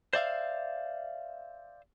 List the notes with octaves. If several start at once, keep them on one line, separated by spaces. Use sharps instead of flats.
C5 D5 E5 F5